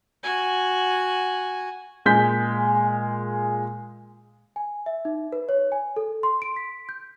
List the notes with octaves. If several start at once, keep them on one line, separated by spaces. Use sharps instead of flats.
F#4 G#5
A#2 G#3 G6 B6
G#5
E5
D#4
B4
C#5
G#5
A4
C6
D7
B6
G6